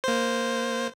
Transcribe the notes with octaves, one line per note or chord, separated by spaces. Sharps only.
A#3 C5